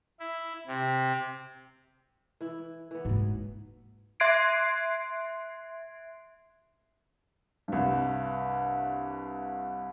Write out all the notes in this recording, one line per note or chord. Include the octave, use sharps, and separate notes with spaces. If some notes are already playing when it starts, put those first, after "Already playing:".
E4
C3
E3 E4
E3 B3
G#2 F#3 A#3
E5 C6 F#6 G#6 C7 D7
C2 G2